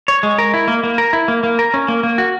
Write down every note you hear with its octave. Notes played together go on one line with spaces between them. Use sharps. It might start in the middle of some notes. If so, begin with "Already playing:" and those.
C#5
G#3
A#4
E4
A#3
A#3
A#4
E4
A#3
A#3
A#4
C#4
A#3
A#3
F#4